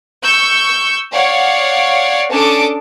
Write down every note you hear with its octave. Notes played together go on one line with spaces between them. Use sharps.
C#6 E6 G6
C#5 D5 F5 F#5
C#4 D4 A4 A5 D6 D#6